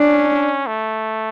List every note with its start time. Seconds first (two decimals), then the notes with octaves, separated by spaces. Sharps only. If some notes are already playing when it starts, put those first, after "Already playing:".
Already playing: C#4 D4
0.67 A3